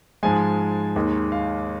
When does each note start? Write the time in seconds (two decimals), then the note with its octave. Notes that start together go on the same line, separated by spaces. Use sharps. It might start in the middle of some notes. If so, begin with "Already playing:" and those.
0.23 G#2 F3 G#3 G#5
0.96 D#2 D#3 G#3
1.32 F5